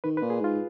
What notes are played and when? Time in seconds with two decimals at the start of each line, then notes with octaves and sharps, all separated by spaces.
0.04 D#3 B4
0.17 B4
0.22 A#2
0.30 G#4
0.40 G#2 F4